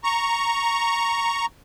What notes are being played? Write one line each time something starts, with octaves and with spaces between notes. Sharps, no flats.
A#5 C#6